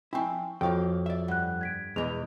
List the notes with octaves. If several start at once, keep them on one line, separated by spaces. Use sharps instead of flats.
F3 C4 E4 G5 G#5 C#6
F2 A#3 F#4 C#5 F5 G5 C#6
D5 E5
G2 F#5 F#6
G#6 B6 D7
E2 B2 E3 G#3 F7